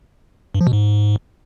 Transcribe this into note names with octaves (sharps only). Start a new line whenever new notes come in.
G2
F3
B2
G#2